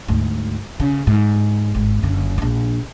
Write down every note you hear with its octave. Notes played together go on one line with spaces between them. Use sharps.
D2 G#2
C#3
G#2
G#1
F#1 D3
A#1 D4